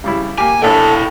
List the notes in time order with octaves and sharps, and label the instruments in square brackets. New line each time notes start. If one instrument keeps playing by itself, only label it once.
[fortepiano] C#3 G3 E4
[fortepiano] A#3 G4 [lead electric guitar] G#5
[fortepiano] A#1 C#5 [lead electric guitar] E4 G5 [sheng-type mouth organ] A4